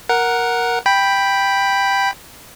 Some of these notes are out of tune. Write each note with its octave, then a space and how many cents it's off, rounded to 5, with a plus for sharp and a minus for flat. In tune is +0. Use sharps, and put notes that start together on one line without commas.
A#4 +5 F#5 +0
G5 +5 B5 +0